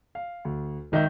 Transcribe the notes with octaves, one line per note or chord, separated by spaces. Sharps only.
F5
D2
G#1 D#3 D#5 E5 G6